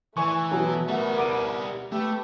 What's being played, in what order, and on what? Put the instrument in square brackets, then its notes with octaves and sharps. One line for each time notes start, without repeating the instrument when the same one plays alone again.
[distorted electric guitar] E3 [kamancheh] A3 [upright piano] G#5 C#6
[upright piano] B2 F#3
[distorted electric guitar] G3 E5 [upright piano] A3 F#5 [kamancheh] B3 A#4
[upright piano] D6 D7 D#7
[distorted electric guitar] A3 [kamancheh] G4 B4